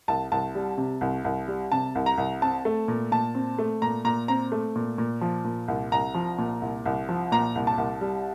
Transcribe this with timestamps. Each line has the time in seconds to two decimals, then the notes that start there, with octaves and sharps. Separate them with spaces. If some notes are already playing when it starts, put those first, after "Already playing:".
0.08 C2 A5
0.32 C2 A5
0.55 G3
0.78 C3
1.01 C2
1.24 C2
1.48 G3
1.72 C3 A5
1.95 C2
2.06 A#5
2.18 C2
2.42 C4 A5
2.65 A3
2.88 A#2
3.11 A#2 A5
3.35 C4
3.58 A3
3.82 A#2 A#5
4.05 A#2 A#5
4.28 C4 A#5
4.52 A3
4.76 A#2
4.98 A#2
5.21 F3
5.44 A#2
5.68 C2
5.92 C2 A#5
6.14 F3
6.38 A#2
6.62 C2
6.85 C2
7.09 F3
7.32 A#2 A#5
7.55 C2
7.67 A5
7.78 C2
8.01 G3